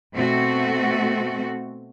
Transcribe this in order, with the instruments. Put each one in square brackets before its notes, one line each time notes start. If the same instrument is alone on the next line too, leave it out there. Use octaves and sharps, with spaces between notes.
[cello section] B2 A3 C4 F#4